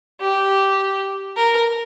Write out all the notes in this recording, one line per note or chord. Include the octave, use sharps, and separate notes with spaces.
G4
A#4